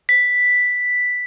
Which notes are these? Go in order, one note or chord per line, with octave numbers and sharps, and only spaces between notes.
B6